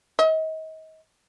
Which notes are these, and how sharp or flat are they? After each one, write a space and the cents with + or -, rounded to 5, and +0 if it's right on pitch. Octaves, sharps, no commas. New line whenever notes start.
D#5 +35